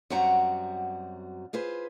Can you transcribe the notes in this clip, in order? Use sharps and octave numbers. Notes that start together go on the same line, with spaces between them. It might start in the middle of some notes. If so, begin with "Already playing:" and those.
F#2 G3 C4 F#4 F#5 A#5
F4 G#4 B4 C5